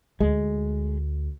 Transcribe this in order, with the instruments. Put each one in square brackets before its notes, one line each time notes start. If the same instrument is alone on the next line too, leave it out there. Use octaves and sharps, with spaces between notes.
[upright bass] D2 [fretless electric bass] G#3